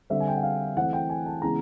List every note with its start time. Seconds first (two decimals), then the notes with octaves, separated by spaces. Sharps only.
0.10 D3 G3 C4 E5
0.20 G#5
0.28 G5
0.36 F#5
0.43 F5
0.77 E3 A3 C4 F#5
0.93 G5
1.10 G#5
1.26 A5
1.42 C#3 E3 G#3 B3 A#5